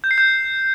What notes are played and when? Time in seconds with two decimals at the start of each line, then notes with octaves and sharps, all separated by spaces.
0.04 G6
0.11 C7
0.18 G6